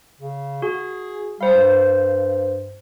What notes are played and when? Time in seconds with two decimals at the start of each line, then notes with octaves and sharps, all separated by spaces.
0.20 C#3
0.62 F#4 G#4
1.41 G3 C5 F5
1.55 G2